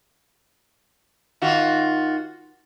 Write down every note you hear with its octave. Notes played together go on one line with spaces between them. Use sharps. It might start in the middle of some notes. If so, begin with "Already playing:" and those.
D#3 F4 F#4